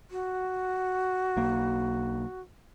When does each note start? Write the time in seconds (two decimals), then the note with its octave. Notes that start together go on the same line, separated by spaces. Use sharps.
0.11 F#4
1.37 B1 A#3